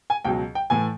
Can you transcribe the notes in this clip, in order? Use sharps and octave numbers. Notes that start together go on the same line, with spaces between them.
G#5
C#2 B2 F#3 G5
G5
A2 E3 A3 G#5